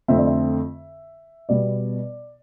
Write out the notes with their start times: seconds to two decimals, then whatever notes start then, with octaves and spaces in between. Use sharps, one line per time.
0.08 F2 D3 A3 C4 E5
0.18 D5
0.27 E5
1.49 B2 G3 B3 D5